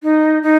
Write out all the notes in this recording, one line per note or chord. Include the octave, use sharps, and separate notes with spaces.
D#4
D#4